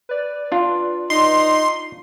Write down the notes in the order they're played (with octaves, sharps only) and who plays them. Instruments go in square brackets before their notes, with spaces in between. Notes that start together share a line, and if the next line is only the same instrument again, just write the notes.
[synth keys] B4 D5
[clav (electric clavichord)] D4 F4
[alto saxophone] D#4 [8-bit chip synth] C6